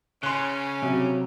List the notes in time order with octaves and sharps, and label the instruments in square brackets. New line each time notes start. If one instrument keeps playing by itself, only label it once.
[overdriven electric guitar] C#3 [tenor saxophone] C#4 [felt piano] C6 F#6
[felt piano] C3 [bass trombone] F#3